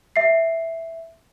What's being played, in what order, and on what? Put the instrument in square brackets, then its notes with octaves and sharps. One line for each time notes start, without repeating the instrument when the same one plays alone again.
[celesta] E5 C7